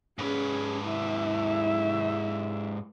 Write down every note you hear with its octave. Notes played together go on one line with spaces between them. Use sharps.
G#2 C#4 G#4 B4
E4 E5